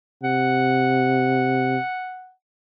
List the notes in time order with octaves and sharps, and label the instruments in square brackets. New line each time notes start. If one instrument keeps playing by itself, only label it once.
[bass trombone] C3 [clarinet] F#5